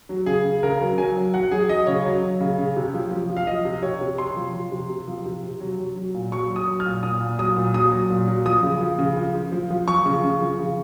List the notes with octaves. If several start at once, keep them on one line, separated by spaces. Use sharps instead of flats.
F#3
C#3 G#4
C#3
C#3 A#4
F#3
F#3 G#5
F#3
F#3 F#5
F#3 G#4
F#3 D#5
C#3 C#5
F#3
F#3
C#3
C#3
C3
F3
F3
F3
F5
F3 D#5
C3
C3 C#5
C3
C3 C6
F3
F3
C3
C3
F3
C3
C3
F#3
F#3
F#3
A#2
F#3 C#6
F#3
D#6
F#3
F6
A#2
A#2 D#6
A#2
F#3 D#6
A#2
F#3 D#6
F#3
A#2
F#3
F3 D#6
C#3
F3
C#3
F3
F3
F3
F3
F3 C#6
C#3
C#3
F3
C#3